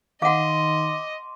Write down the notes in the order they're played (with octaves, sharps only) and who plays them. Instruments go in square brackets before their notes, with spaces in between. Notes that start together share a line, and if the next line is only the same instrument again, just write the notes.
[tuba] D#3 [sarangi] D#5 [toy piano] F5 F#5 [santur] C6 D6